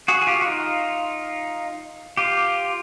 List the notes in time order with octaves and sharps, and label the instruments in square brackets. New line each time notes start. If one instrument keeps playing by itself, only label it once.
[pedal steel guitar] F#4 G#4
G#4
F4 G4
F#4
D#4 F4
F4 G4